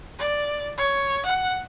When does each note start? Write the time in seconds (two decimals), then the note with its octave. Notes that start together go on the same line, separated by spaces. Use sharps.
0.19 D5
0.78 C#5
1.26 F#5